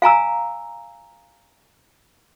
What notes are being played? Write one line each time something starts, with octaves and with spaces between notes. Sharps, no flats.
F5 G#5 A#5 E6